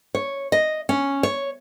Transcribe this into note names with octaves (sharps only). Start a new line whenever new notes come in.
C#5
D#5
C#4
C#5